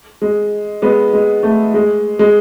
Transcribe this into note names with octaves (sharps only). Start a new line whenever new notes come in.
G#3
G#3 B3
G#3
A3
G#3
G#3